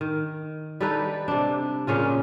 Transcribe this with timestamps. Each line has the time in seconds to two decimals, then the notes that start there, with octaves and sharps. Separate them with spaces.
0.01 D#3
0.80 G3 D#4 A4 B4
1.28 C3 D4
1.87 A#2 C#3 C#4 F4